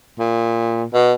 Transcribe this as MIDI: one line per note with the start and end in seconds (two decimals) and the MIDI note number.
0.19 0.84 46
0.94 1.13 47